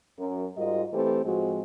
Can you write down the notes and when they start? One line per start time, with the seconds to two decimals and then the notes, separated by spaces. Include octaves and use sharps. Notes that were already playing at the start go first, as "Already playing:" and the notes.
0.19 F#2 A#4
0.57 G#2 G3 F4 F#4 A#4 D#5
0.93 E3 A3 C4 G4 A4 C5
1.25 A2 F3 G#3 C4 F#4